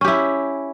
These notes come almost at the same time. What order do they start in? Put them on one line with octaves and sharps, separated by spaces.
C#4 G4 E4